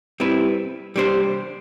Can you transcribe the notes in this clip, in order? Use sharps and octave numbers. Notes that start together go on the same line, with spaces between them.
G3 C4 E4 B4
G3 D4 G4 C5